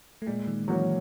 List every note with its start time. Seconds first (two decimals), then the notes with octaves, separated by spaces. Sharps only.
0.22 A3
0.26 A#2 G#3
0.47 D#3
0.68 E3 F#3 A#3 C#4 F#4